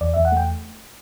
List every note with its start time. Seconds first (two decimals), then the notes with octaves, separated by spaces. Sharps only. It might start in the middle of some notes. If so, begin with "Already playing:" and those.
0.01 E2 D5
0.14 E2 E5
0.25 F#5
0.32 A3 G5